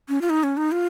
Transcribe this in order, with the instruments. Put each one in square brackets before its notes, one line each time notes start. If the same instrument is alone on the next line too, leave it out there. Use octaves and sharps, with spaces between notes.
[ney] C#4
F4
D#4
C#4
D#4
F4